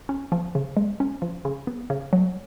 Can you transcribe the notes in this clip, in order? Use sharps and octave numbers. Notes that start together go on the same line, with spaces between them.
C#4
F3
C#3
G#3
C#4
F3
C#3
B3
C#3
F#3